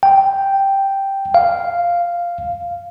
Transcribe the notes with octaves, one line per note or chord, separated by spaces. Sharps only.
G5
F5